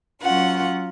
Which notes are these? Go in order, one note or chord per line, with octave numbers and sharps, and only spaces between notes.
F#3 C#4 F4 F#5